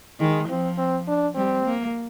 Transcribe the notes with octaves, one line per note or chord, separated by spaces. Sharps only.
D#3 G#3
F3 C4
C4
D4
G3 C4
A#3